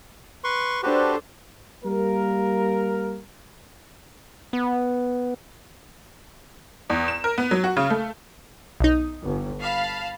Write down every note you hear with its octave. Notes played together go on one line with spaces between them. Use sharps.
B4 C6 C#6
D4 F#4 G4 A4 B4 C5
G3 A#3 A#4
B3
E2
E7
A#4
B3
F#3
F#4
C#3
A3
B1 D#4
G1
F5 A5 B5